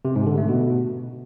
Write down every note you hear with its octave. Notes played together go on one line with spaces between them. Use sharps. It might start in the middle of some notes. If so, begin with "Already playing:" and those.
C3
G#2
D3
A3
B2